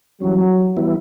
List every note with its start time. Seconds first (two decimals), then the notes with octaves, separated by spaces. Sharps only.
0.21 E3 F#3 G3 C#4
0.77 E3 G3 B3 E4